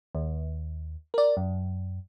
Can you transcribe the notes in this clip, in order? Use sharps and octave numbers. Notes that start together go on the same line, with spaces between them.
D#2
A#4 D5
F#2